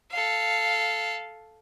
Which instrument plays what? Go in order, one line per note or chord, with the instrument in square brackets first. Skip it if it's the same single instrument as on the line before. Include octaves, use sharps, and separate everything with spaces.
[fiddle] A4 F5